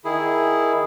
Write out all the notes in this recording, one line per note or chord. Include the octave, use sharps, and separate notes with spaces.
D#3 E4 G#4